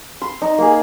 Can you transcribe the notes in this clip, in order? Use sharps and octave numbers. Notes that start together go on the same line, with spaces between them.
C6 E6
D#4
A#3 G#4